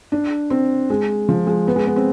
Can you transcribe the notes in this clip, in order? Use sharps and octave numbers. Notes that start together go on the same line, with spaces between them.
D4
C4
G#3
F3
G#3
B3
G#3
B3
C4